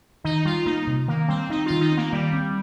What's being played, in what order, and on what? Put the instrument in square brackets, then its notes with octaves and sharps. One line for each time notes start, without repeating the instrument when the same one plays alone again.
[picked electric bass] D#3 [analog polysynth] D#4
[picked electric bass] G3 [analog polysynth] F4
[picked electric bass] A#3 [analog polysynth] D#4
[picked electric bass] C3
[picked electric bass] D#3 [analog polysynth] A#3
[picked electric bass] G3 [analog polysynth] C4
[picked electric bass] C4 [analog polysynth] D#4
[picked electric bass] D#3 [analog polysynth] F4
[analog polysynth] D#4
[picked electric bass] C4
[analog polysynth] A#3
[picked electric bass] D#3 [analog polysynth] G3
[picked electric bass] C4